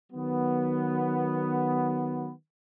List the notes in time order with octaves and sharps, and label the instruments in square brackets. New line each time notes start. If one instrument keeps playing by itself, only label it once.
[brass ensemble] D#3 F#3 B3